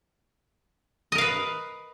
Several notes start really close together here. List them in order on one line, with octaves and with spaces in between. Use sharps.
D#5 A#4 F5 B4